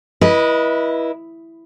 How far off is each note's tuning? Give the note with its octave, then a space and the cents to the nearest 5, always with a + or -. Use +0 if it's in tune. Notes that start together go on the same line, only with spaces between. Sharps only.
E4 +0 B4 -30 D#5 +0